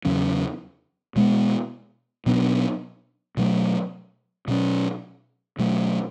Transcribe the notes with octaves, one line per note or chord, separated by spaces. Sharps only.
E2 C#3 F#3 C#4
B2 G#3 B3
B2 F#3 B3 D4
B2 F#3 A3
B2 F#3 C#4
B2 F#3 A3